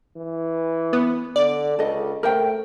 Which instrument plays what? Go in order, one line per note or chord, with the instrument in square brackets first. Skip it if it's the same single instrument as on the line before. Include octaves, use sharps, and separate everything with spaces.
[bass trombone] E3
[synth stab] B3
[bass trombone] D3 [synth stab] D5
[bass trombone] C#2 [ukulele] A4 D#5
[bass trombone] A3 [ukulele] A#4 C5 G5